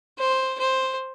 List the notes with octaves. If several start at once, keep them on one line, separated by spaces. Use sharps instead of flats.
C5
C5